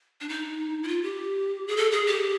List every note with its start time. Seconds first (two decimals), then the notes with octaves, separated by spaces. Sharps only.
0.21 D4
0.29 D#4
0.83 E4
0.88 F4
1.03 G4
1.68 G#4
1.77 A4
1.92 G#4
2.07 G4